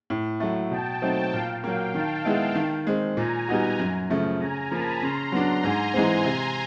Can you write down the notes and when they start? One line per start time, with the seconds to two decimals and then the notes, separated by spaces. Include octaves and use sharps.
0.10 A2
0.40 F#3 A3
0.71 B2 G5 A5
1.02 F#3 A3 C4 D#4
1.33 A#2 F5 G5
1.64 F#3 A#3 F5 G5
1.95 D#3 G5 A5
2.25 G#3 B3 E4
2.55 D#3
2.87 G#3 C4
3.17 A#2 G#5 A#5
3.48 G3 B3 D#4 F#4
3.80 F#2
4.10 C#3 F3 A3
4.40 C#3 G#5 A#5
4.71 F3 A#3 A5 B5
5.02 C#3 A#5 C6
5.32 F#3 B3 D4
5.63 G#2 G#5 A#5
5.94 E3 G#3 C4
6.25 C3